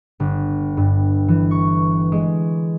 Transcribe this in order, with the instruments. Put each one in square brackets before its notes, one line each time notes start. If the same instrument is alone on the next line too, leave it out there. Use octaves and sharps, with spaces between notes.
[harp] G1
G2
E3
C#6
G#3